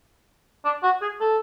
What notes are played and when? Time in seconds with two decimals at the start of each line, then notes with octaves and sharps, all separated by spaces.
0.65 D4
0.83 F#4
1.01 G#4
1.21 A4